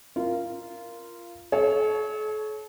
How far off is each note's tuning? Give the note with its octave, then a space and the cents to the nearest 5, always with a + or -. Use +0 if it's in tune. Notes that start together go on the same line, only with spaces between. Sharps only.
F4 -15 A#4 +0
A4 -45 C#5 +0